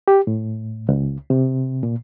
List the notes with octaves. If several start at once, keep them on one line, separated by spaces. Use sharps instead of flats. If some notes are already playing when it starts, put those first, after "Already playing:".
G4
A2
C#2
C3
A#2